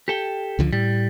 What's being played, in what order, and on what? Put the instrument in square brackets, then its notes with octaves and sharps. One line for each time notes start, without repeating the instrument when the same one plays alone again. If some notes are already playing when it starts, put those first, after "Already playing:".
[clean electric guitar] G4 A4 G5
[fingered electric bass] C#2 D3 F3
[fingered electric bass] A2 [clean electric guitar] G3